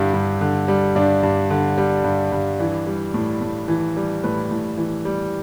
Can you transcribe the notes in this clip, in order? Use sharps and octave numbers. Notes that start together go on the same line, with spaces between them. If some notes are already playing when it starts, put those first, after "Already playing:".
Already playing: G2 D3 G3 E4
G2
D3
G3
G2 D4
G2
D3
G3
G2
G2
E3 D4
G3
A2
A2
E3
G3
A2 B4
A2
E3
G3